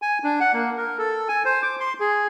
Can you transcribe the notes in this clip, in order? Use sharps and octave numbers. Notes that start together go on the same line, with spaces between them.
G#5
D4
F#5
A#3
A#4
A4
G#5
C5
D6
C6
G#4